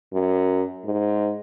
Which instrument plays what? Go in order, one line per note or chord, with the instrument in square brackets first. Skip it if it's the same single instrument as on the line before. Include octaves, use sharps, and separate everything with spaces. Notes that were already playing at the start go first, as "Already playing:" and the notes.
[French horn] F#2
G#2